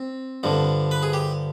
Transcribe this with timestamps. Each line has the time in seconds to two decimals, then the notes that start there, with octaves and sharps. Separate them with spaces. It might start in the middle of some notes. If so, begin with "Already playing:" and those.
Already playing: C4
0.43 G2 D3 F3
0.91 B4
1.03 G#4
1.13 G4